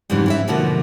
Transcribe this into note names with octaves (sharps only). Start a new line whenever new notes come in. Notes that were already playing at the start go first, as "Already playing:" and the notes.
F2 G#2 C#3 E3 G3
E3 C#4 E5
B2 D3 F3 A#3 F#4